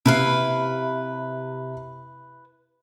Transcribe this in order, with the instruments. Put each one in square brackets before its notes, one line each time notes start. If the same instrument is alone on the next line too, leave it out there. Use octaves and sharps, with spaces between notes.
[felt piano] C3 [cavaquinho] E4 B4 F5